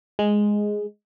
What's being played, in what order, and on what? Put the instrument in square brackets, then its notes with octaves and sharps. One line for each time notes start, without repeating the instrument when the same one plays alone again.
[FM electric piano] G#3